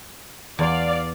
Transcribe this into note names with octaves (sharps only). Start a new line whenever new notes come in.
E2 D5 F5 C6